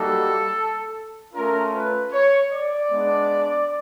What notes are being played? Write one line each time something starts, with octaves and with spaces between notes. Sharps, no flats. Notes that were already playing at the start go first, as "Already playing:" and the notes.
Already playing: G3 A#3 D#4 F#4 A4
A3 C#4 F4 A#4
B4
C#5
D5
G#3 B3 D4